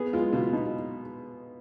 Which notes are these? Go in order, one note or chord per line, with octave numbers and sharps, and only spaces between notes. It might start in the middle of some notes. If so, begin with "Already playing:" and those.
Already playing: B3 G#4
G#3 F4
B2 F4
B2 D#4